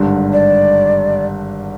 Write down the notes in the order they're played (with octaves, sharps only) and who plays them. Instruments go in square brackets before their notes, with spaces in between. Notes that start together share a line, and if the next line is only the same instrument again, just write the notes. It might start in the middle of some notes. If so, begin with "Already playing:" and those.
Already playing: [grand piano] G#1 G2 D3 G3
[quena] D5